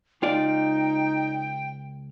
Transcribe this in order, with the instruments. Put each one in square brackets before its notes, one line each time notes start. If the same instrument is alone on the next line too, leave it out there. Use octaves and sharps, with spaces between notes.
[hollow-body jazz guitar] C#2 F4 D5 [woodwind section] D#4 [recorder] G5